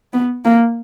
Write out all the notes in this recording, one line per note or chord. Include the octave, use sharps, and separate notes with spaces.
B3
A#3